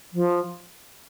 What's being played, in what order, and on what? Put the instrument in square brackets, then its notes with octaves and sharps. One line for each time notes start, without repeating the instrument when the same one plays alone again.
[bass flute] F3